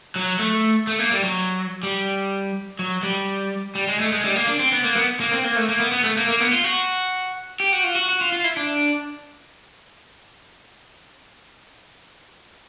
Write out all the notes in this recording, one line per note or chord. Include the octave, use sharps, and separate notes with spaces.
F#3
A3
A3
A#3
G3
F#3
G3
F#3
G3
G3
G#3
A3
G#3
G3
A#3
D4
C4
B3
A#3
B3
A#3
C4
A#3
A3
A#3
B3
B3
A3
A#3
A#3
B3
F4
F#4
G4
F#4
F4
F#4
F#4
F4
F4
E4
D4